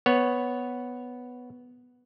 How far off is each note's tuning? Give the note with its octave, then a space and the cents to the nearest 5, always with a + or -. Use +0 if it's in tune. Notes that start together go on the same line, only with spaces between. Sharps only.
B3 +0 C#5 +0